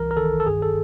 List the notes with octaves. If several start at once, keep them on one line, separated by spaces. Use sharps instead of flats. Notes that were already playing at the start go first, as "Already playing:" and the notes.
Already playing: C2 E3 A#4
A#4
D#3 A4
A4
G2 G#4
A4